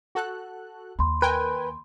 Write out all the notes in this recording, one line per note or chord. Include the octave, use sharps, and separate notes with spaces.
F#4 A4 F#6
D#2 B5 C6
A#4 B4 G5 G#5